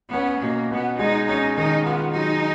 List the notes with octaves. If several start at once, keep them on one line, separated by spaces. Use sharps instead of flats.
B3 C#4
B2 A#3
B2 B3
G#3 D#4
C#4 D#4
D#3 D#4
B3 F4
F#3 D#4